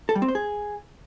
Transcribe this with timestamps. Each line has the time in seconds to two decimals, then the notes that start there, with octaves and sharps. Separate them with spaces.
0.09 A4
0.15 G3
0.22 C4
0.28 C5
0.35 G#4